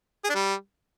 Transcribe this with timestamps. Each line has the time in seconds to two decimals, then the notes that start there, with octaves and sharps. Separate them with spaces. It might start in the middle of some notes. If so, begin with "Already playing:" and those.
0.24 G#4
0.30 D4
0.35 G3